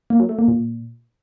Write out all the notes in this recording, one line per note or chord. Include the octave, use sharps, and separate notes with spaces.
A#3
F#3
A3
A#3
A#2